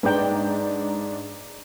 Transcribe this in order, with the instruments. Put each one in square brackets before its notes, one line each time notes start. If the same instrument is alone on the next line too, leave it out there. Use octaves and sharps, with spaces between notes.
[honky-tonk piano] G#2 D4 A#5 [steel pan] B4 G5